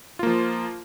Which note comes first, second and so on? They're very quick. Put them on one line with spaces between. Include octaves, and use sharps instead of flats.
F4 A#3 F3